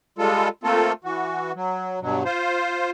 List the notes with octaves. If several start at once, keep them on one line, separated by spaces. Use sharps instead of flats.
G3 G#3 F4 A4
A3 A#3 C4 F4 A4
E3 F#4
F#3
G2 B2 F#3
F4 C5